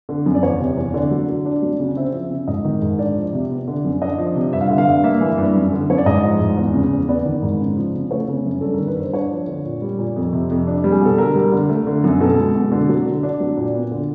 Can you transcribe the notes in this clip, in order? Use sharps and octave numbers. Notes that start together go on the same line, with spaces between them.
D3
F#2
D5
E2 C#5
C3
E2
D3 D5
F#3
D3
D4
F#3
C#3
C4 E5
F3
C#3
G#2 D#5
D#3
G#2
D4 D5
F3
C3
B3
D3
F#2
D4 D#5
F3
C3
G2 E5
F5
D3 E5
F5
G2
A#3 E5
E3
G2
F#2
D3
F#2 C#5
D5
G#2 D#5
F3
G#2
E2
C#3
E2
B3 D5
D#3
G#2
C#3
F3
C#3
A3 C#5
C#3
F#2
G2 A4
A#4
D#3
B4
G2 C5
D4 C#5
F3
D3
A#2
G3
A#2
F2
C3
F2
D4
G3
G#4
B2 A4
D3 A#4
G3
D3
A3
D3
F#2
B2 A4
G#3
B2
D3
F#3
D3
D4
F#3
A#2
B3
D3